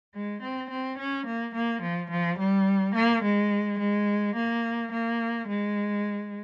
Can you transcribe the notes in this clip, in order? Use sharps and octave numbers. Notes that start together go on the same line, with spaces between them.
G#3
C4
C4
C#4
A#3
A#3
F3
F3
G3
A#3
G#3
G#3
A#3
A#3
G#3